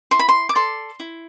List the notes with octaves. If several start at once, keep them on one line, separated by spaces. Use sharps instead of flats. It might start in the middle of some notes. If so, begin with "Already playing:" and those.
E4 C6
B5
C6
D6
A4 D5 C6
E4